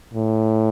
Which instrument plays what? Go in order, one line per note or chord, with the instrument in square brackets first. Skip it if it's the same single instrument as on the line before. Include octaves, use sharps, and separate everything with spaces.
[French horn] A2